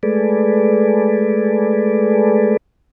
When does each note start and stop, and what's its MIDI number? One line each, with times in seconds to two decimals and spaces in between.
0.03 2.57 56
0.03 2.57 57
0.03 2.57 68
0.03 2.57 69
0.03 2.57 71
0.03 2.57 74